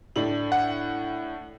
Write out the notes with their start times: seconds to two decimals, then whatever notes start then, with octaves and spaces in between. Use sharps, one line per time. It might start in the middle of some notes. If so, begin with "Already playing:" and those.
0.16 A2 D4 F#7
0.52 F#5